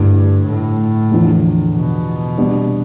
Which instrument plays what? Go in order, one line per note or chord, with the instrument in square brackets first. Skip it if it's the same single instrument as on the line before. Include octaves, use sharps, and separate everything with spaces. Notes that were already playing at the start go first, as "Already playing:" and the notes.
Already playing: [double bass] G2 [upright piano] D3 A3 E4
[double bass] A2
[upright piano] E2 D3 F3
[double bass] B2
[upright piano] C3 G3 B3 D4